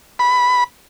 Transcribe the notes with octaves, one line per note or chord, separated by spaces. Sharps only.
B5